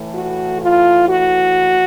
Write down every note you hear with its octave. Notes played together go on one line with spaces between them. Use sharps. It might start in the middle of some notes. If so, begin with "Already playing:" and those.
Already playing: A2 E3 A3
F#4
F4
F#4